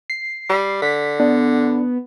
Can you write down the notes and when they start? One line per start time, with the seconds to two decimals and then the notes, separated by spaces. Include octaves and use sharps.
0.10 C7
0.49 G3
0.82 D3 B6
1.20 B3 D4